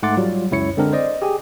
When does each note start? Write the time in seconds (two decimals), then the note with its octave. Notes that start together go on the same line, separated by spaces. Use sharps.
0.03 G#2 A3 F#5 C6 D6 A6
0.17 F#3 G3 F4
0.51 C#2 F#2 E4 C#5 C#7
0.77 D3 G#3 C4 D4 A#4
0.93 C5 D5 D#5
1.22 G4 G#4 G5 G#5